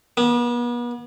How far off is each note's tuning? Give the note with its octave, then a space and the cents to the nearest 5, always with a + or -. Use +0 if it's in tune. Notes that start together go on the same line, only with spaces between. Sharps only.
B3 -40